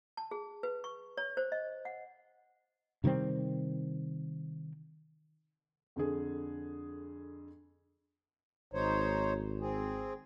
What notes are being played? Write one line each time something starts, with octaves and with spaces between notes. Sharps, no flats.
A5
G#4
B4
C#6
C#5
C5
D#5
F#5
C3 D#3 G3 C4
F2 D3 G#4
G#1 D#4 C5 C#5
C4 G#4